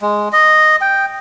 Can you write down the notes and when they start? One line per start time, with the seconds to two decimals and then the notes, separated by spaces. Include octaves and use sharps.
0.02 G#3
0.33 D#5
0.81 G5